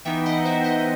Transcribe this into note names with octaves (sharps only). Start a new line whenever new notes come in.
E3 B3 D#4 E5 G5
D#5 F#5
C5 E5
D#5